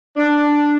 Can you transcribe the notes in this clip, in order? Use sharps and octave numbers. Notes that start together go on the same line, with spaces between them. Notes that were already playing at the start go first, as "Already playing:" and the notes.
D4